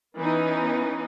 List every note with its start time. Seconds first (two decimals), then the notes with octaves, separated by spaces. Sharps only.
0.17 E3 B3 C#4 D#4